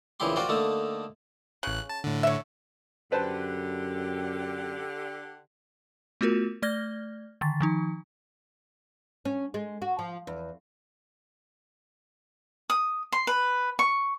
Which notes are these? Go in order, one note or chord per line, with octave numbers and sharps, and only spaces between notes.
A#1 C#3 E3 E4 G4 C6
F4 F#4 A#4 C5 D5 G5
D3 A3 A#3 D#4 A4
A1 C#3 F#6
A5
A2 D3
C#5 E5
F#2 D3 G4 B4 C5 A5
A3 B3 F4 F#4 A#4
A3 D5 F6 G#6 A#6 G7
D3 D#3 A6
D#3 F3 D#4
C#4
G#3
F#4
F3
E2
D#6
C6
B4
C#6